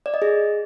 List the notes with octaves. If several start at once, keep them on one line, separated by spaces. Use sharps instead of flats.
D5
D#5
G#4